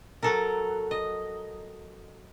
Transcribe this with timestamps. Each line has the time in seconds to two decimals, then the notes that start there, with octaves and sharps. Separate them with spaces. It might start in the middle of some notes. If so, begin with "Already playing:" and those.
0.23 F#3 A4 A#4
0.91 D#5